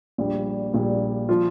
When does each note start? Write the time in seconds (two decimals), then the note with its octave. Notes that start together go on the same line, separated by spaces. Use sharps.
0.18 A#1 A#2 G3
0.74 A#1 A#2 G3
1.29 F3 F4